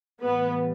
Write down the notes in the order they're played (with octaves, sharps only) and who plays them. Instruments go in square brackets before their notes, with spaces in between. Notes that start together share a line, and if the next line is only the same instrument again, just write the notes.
[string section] A2 E3 G3 B3 B4